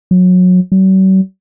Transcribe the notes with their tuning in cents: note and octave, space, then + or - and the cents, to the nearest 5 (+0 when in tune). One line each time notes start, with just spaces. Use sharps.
F#3 -25
F#3 +45